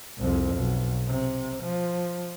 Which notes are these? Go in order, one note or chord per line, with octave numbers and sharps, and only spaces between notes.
C2 F2
B1
C3
F3